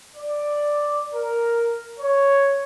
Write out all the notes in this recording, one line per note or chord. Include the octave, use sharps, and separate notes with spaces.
D5
A#4
C#5